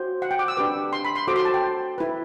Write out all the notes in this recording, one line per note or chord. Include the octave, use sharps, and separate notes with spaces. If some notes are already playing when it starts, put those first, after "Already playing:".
Already playing: F#4 C5
F#5
G5
D6
E6
D4 G4 B4 D6
C6
B5
C6
F#4 A4 C5 D6
C6
A5
G5
E4 B4